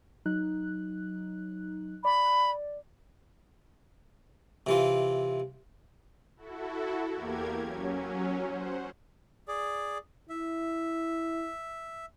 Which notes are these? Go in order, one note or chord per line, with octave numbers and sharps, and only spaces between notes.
F#3 D#4 F#6
D5 B5
C3 E3 F4
E4 F#4 A4
E2 A#3 G4 A#4 G#6
F#3 C#4
C5 F#5
G#4 D5
E4 E5